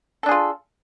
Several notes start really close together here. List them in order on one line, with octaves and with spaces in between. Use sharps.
A4 D4 G#4 F4